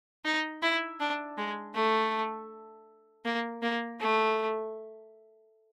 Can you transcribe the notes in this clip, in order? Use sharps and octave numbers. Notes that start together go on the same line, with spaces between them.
D#4
E4
D4
G#3
A3
A#3
A#3
A3